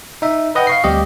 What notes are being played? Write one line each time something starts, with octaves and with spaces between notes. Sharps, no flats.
D#4 E5
B4 D#5 F#5 G5
F5 C#6 C7
D2 G3 C4 G4 D#5